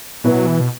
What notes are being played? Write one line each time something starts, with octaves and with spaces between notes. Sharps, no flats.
B2 F#3 B3 E4 B4
E3
B2